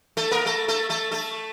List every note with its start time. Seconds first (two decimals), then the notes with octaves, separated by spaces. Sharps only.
0.17 A3 A4
0.31 A#3 A#4
0.46 A3 A4
0.68 A3 A4
0.90 A3 A4
1.11 A3 A4